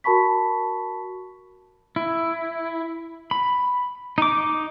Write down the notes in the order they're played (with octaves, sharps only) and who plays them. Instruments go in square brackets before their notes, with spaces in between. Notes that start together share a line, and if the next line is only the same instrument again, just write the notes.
[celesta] F#4 A#4 A5 B5 C#6 B6
[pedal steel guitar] E4
B5
D#4 D6